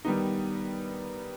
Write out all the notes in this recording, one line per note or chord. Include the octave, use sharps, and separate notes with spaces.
D#3 G3 B3 D#4